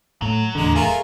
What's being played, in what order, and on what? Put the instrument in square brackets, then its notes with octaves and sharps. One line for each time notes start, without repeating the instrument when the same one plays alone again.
[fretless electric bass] A2 A3 [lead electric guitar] F#3
[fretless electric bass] D#1 E2 A2 [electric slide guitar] D3 [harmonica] G#3
[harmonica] A3 F4 A#4 [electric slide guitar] G#4